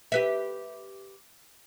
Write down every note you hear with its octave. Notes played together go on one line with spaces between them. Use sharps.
G4 B4 E5